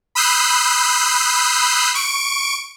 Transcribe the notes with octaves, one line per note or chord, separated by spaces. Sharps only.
B5 D#6 E6 F#6 G6 C7
C#6 D7